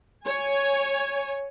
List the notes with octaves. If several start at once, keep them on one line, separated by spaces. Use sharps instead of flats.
C#5 G#5